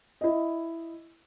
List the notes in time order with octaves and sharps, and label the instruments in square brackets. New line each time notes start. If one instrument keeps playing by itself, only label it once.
[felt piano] E4 D#5